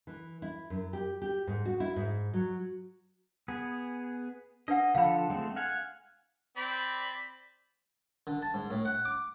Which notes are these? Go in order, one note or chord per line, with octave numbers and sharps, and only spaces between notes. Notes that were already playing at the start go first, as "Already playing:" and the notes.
E3
E4
F#2
G4
G4
G#2
F#4
E4
G#2
F#3
B3 G#4
D4 B4 D#5 F#5
D3 F3 A4 F5 B5
G#3 A3 C4 G5
F5 F#5 G#5
C4 D5 B5
D3
A5
G#2
A2
F#5
D6